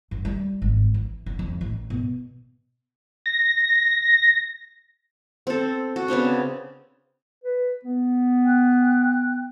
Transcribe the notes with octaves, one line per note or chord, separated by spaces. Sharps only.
F#2
G3
G#1
E3
D3
F2
A1
B2
A#6
C4 A4
F#4
C#3 B3 C4 D4
B4
B3
G5 F#6